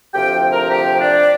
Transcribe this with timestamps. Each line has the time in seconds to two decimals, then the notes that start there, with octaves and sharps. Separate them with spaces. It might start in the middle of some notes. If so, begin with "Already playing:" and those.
0.14 D2 C3 F3 G4 G5
0.51 A#4 A#5
0.71 G4 G5
0.99 D4 D5